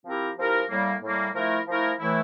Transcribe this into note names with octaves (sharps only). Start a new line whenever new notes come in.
F3 C4 E4 G4 A#4
F3 C4 E4 G4 A#4
A2 G3 A#3
A2 G3 A#3
F3 A3 E4 A#4
F3 A3 E4 A#4
A2 E3 A3 E4